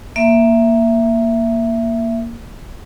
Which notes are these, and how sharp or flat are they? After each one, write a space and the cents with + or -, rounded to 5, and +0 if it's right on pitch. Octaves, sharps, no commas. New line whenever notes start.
A#3 +0 E5 +10